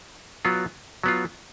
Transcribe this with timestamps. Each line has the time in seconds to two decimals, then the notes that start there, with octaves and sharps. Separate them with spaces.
0.45 F#3 B3 F4
1.03 F#3 B3 F4